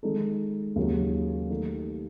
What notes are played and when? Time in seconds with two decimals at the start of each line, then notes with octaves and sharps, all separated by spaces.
0.03 D#3 G#3 D#4 A4
0.76 D#2 C#3 F#3
1.50 D#3 A3 D#4